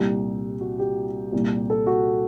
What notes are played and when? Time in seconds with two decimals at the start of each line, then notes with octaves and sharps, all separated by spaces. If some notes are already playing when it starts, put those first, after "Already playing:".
Already playing: C2 A#2 G4
0.60 F#4
0.79 G4
1.33 C2 A#2
1.70 A4
1.87 F#4